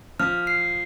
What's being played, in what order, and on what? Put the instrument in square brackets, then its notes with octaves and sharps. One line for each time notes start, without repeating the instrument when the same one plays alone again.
[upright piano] F3 [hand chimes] F6
[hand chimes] C7